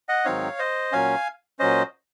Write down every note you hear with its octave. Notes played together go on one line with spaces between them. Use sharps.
D#5 F#5
G#2 D#3 F#3 C4 D#4 C#5 F5
C5 D#5
A#2 F#3 C#4 F5 G#5
A#2 F#3 C#4 C5 D#5